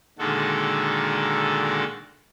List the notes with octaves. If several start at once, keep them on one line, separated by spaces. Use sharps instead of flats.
A#2 D3 D#3 G#3 F#4 A4